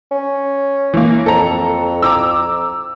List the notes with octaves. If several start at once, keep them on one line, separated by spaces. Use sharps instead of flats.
C#4
E3 A#3
F2 A4 A#5
A#5 D6 E6